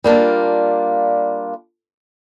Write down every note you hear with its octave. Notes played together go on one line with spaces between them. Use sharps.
G3 A#3 D4 F4